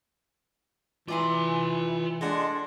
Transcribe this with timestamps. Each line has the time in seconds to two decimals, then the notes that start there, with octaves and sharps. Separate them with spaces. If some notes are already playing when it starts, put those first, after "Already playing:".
1.08 E3 F4 D5 G#5 A#5 C6
2.21 G#3 D4 A4 F#5 C6